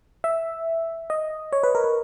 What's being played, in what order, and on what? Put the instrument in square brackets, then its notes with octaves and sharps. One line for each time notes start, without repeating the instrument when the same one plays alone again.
[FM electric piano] E5
D#5
C#5
B4
A#4
B4